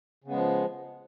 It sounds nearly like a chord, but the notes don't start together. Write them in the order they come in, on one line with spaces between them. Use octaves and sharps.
C#3 B3 G#3 F3